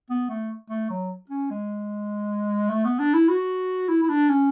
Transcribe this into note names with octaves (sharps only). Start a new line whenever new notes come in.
B3
A3
A3
F#3
C#4
G#3
A3
B3
D4
E4
F#4
E4
E4
D4
C#4